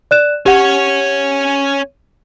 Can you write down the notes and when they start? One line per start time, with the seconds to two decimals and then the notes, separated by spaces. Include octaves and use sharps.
0.11 D5 F#6 E7
0.46 C#4 G4 C#5 F#5